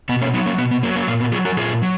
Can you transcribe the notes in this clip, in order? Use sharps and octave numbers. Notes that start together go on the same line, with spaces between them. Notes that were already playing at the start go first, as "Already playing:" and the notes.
B2 B3
A#3 C#4
F#3 B3 D#4
A#3 C#4
B2 B3
B3
F#3 A#3
A#3
A#2 A#3
B3
F#3 F4 G#4
F#4 A#4
A#2 F4 G#4
F#3